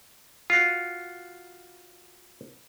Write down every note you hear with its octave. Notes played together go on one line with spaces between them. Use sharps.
F4 F#4